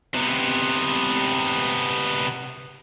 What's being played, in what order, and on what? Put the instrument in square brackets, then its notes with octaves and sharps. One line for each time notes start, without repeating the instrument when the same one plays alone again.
[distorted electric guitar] C3 B3